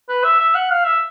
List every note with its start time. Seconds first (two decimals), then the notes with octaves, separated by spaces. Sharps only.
0.09 B4
0.24 E5
0.40 E5
0.54 F#5
0.70 F5
0.85 E5